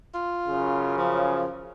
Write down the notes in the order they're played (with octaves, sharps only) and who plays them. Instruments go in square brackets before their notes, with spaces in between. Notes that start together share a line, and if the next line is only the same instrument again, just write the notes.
[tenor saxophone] F4
[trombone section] F#2 C#3
[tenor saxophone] F3